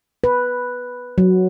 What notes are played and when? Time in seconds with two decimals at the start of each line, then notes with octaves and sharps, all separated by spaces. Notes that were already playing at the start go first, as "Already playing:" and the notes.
0.24 B4
1.18 F#3